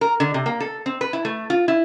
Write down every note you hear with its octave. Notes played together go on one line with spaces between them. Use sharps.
A#4
D3
C3
A#3
A4
C4
B4
E4
A3
F4
E4